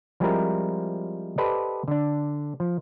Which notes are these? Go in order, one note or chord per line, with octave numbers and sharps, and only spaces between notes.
F3 G3 G#3 C4 E4 A#4
G4 A4 B4 C5 D5 D#5
D3 D4
F3